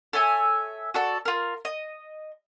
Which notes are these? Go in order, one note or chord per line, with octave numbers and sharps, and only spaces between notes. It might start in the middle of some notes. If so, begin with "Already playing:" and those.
A4 C#5 E5 G#5
F#4 A4 D5
F4 A#4
D#5